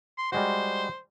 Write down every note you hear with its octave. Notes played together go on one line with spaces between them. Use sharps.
C6
G3 G#3 F#4 C5